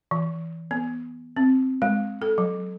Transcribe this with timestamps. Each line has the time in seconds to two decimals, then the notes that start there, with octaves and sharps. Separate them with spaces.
0.11 E3
0.71 B3
1.37 C4
1.82 G#3
2.22 A4
2.38 F#3